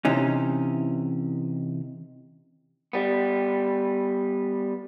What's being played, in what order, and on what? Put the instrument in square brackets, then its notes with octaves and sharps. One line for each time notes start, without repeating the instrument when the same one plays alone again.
[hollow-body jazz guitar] C3 E3 C#4 D#4
[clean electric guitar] G3 B3